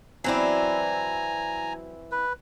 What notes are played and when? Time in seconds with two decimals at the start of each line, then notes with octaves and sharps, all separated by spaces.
0.24 E3 F#3 C4 E4 D5 G#5 A#5
2.11 B4